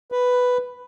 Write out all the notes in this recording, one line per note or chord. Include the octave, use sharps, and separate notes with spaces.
B4